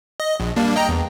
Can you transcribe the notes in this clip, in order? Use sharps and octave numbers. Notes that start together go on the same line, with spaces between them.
D#5
A#1
G3 A#3 D4
D#5 G5 A#5
E2